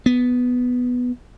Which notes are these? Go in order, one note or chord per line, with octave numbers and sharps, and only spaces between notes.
B3